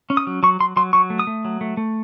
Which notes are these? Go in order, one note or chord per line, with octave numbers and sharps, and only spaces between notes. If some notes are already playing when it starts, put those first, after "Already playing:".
C#4
D#6
F#3
F#3 C#6
F#3 C6
F#3 C6
F#3 C#6
A3
D#6
A3
F#3
A3
A3